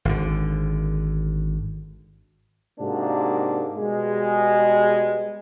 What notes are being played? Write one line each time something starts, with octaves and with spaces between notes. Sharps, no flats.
G#1 D3
G#2 C3 A#3 D4 F#4
B2 G3 G#3